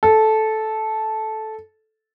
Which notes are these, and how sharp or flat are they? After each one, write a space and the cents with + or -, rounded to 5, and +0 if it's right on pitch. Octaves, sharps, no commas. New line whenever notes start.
A4 -10